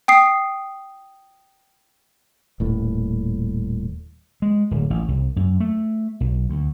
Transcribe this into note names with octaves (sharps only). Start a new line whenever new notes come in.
G5 D#6 C7
D#1 A2
G#3
D1
A1
C2
F#2
A3
B1
D2